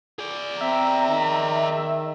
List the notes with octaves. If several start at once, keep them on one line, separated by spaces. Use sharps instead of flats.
G#4 D5
C4 E5 A#5
D#3